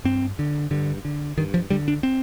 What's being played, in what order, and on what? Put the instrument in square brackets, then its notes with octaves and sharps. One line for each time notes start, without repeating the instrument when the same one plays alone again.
[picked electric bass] G2 C4
D3
G2 D3
D3
G2 D#3
F3
D3 G3
D4
C4